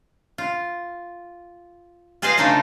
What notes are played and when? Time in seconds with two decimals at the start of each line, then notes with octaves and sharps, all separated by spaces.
0.38 F4
2.22 F4 G#4 B4 C5 D#5 F5
2.38 C#3 A3 D4 D#4 F4 A4